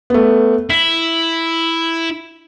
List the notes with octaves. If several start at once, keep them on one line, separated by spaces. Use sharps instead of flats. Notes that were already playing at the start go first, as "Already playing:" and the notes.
A3 B3
E4 B6